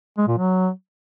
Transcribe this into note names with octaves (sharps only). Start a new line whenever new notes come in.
G#3
A#2
F#3